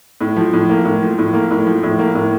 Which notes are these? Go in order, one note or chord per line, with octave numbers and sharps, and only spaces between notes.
A2
F3
A2
A#3
A2
F3
A2
A#3
A2
F3
A2
A#3
A2